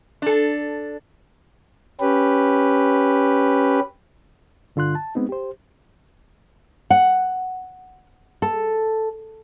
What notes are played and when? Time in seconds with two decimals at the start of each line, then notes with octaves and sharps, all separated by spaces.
0.22 D4 A4
2.00 C#4 G4 B4
4.76 G2 D3 F4 C6 F#6
4.95 A5
5.15 G#3 B3 C4 D#4
5.29 G4 C5
6.90 F#5
8.42 A4